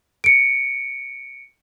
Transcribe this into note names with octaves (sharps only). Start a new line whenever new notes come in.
C#7 D7